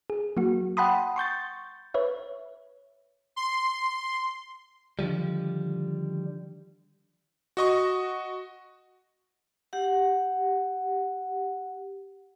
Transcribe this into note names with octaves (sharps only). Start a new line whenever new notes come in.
G#4
F#3 A#3 F#4
F#5 G5 A5 B5 C6 D#6
C6 C#6 G6 A6
B4 C#5 E5
C6
D3 D#3 F3 G3
F#4 D#5 C#6
G4 F#5